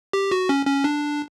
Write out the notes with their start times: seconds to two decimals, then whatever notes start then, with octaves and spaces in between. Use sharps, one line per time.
0.13 G4
0.31 F#4
0.49 C#4
0.66 C#4
0.84 D4